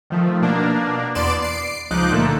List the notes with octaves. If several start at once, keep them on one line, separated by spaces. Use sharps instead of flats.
D#3 F3 A3
B2 A#3 D4 A#4
E2 B3 D5 C6 D7 E7
C7 D7
C#2 F3 D#4 D6 F#6 G6
A#2 D3 A3 A#3 A4